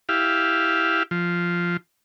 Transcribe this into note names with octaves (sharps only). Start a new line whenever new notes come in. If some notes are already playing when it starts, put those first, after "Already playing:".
E4 G4 F5
F3